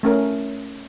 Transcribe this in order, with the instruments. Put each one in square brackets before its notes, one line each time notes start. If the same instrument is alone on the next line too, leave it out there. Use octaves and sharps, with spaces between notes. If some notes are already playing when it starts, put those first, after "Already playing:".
[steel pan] A3 C#4 A#4